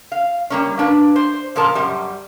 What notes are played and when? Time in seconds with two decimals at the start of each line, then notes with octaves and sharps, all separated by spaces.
0.12 F5
0.50 G3 A#3 C#4
0.78 A#3 D4 B4
1.16 C5
1.56 A#2 F3 A#4 A5
1.75 F#2 G3